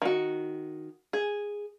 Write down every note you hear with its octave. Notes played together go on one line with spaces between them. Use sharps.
D#3 F#4
G#4